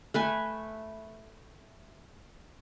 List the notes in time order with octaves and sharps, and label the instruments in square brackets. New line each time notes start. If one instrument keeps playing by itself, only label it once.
[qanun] A3 B4 G#5